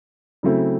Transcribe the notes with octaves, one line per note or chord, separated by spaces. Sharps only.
C#3 F#3 A3 C4 E4